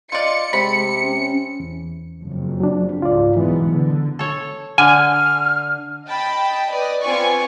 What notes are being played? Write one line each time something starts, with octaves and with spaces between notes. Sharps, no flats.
F4 D5 D#5 C#7
C3 G#3 B5
C#4
E2
F#1 F2
F#3 D4
C#2 G#2 F4 D5
B1 G#2 E3 B3
D3
A4 C#5
D3 G#5 F6
D#5 G5 A5 B5
B4 D5 D#5
B3 C4 F4 D5 G#5 C#6